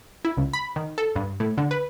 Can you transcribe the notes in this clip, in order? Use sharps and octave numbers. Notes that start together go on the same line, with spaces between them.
E4
C#2
B5
D#3
A4
G2
A2
D3
B4